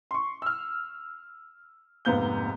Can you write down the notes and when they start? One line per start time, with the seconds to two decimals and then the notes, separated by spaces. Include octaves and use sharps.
0.11 C6 C#6
0.42 E6 F6
2.05 F1 G#2 A#3 B3 G6 G7